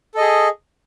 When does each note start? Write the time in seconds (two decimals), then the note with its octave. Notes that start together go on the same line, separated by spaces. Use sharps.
0.15 A4
0.17 D#5
0.20 G#4